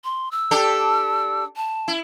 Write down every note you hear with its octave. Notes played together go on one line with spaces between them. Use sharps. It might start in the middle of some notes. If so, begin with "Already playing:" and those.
C6
E6
D4 G4 A4
A5
E4